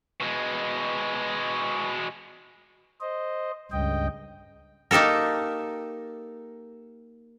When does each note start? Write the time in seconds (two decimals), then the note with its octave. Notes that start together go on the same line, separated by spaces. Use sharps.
0.20 B2 G#3
3.00 C5 D#5
3.71 C#2 G2 D#5 G5
4.91 A#3 D#4 G4 A4 A#4